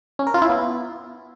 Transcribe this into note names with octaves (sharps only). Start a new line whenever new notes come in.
C#4
A#4
F4
E4
B3